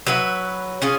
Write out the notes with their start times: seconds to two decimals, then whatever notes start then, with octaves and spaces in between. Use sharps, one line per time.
0.07 F#3 B4 E5
0.82 C#4 F4 G#4